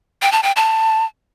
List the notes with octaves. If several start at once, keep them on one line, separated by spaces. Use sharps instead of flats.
G5
A5
G5
A5